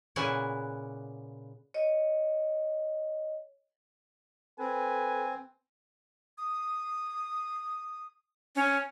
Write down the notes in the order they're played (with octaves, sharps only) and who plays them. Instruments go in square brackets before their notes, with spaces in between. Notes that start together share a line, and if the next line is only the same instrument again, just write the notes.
[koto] A#2 C#3 B3 E4 F#5 G#5
[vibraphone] C#5 D#5
[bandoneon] C4 [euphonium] A4 [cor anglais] B4 [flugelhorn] G#5
[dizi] D#6
[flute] C#4